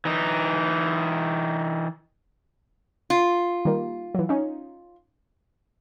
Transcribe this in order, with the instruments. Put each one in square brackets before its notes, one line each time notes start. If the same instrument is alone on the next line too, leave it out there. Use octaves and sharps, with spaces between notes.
[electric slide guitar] E3 D#4
[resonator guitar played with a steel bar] F4
[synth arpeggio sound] D#3 G3 A#3
E3 F#3
C#4 D#4